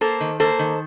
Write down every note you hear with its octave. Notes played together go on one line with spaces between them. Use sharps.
A#3 A4 C5
D#3
A#3 A4 C5
D#3